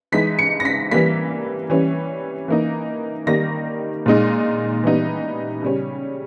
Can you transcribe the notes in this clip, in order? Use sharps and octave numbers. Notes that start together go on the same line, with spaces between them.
E3 G#3 D#4 B6
C#7
A#6
B6
E3 G3 A#3 B6
E3 G3 C#4
E3 A#3 D#4
D#3 G3 A#3 D#4 A#6
A#2 G#3 D#4
E3 G3 B3 D#4
C#3 G3 C#4